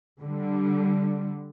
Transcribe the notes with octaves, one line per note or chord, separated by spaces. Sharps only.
D3 G3